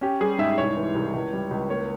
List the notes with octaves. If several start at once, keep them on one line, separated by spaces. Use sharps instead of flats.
C#4 G4
G3 G#4
G#2 E5
C2 C#5
E3
C2
C#2
G3
C#2
A#3 C#5